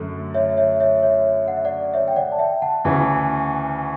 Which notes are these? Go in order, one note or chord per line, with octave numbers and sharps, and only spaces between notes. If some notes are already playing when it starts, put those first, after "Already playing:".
Already playing: F#2 D3 A3
C#5 E5
C#5 E5
C#5 E5
C#5 E5
F#5
E5
D5 F#5
C#5 E5
G5
D5 F#5
A5
E5 G5
F#5 A5
D2 C#3 E3